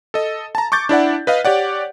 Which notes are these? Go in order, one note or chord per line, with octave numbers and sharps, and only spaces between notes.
A4 D#5
A5 A#5
C#6 D6 G6 A6
D4 E4 D5 F#5
B4 D#5 F5
G4 C#5 D5 F#5